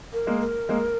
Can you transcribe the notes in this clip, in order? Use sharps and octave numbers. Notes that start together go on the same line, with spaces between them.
A#4
G#3 A#3
A#4
G#3 A#3